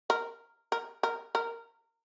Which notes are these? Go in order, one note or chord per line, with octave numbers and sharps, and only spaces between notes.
A#4
A#4
A#4
A#4